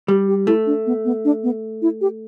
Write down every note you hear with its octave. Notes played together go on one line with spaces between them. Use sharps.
G3 G4
G4
A3 E4
D4
B3
B3
D4
B3
E4
G4